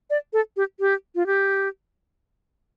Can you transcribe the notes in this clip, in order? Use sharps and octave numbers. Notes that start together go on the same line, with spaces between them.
D5
A4
G4
G4
F4
G4